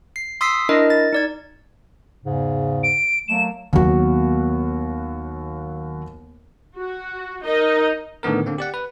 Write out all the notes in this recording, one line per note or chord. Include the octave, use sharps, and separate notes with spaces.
C7
C6 D#6 E6 B6 C7
D4 E4 A#4 D#5
A6
D#4 D5 G#6
E2 G#2 C#3
D7
F#3 A3 A#3 E7
D#2 F#3 A#3 B3 F#4
F#4
D#4 A#4 D#5
A2 D3 D#3 B3 A#4
D3 A#3 C4
G4 D5 F#5
B4